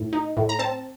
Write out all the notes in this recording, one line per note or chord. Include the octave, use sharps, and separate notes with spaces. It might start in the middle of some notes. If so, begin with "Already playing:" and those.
Already playing: A2
D#4
A2
A#5
C4 A5